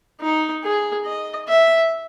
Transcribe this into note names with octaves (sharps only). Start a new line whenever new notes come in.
D#4
G#4
D#5
E5